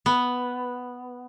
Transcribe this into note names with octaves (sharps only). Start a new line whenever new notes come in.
B3